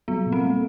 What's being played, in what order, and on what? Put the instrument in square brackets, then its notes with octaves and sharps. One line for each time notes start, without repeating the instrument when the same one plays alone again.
[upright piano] F#3 [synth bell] B3
[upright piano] A#2
[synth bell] C4
[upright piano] A3